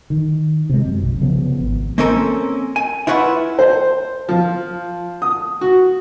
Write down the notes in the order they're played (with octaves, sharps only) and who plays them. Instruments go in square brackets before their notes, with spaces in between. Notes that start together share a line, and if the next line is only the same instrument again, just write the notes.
[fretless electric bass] D#3
C3 G#3
F#2
B1
C2 C#3 F3 B3
G#1
[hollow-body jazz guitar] A#3 C4 C#4 A4 A#4
G#5
E4 F4 B4 C#5 D5 F#5
[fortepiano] C5
F3
D#6
F#4